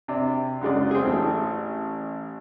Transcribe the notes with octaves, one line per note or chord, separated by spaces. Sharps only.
C3 D5
F#2 C#3 G#3 D5
C4 G#4
A1 A3